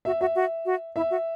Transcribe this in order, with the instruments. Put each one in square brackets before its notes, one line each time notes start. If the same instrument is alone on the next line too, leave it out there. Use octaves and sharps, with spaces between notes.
[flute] F#4 [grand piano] E5
[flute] F#4 [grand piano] E5
[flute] F#4
F#4
[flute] E4 [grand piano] E5
[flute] F#4